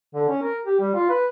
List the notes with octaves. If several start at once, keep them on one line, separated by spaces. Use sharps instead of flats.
D3
C#4
A#4
G4
G3
F4
B4